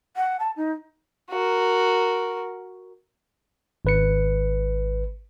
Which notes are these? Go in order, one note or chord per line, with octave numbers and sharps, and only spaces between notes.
F#5
A5
D#4
F#4 A#4
G#1 B4 C#7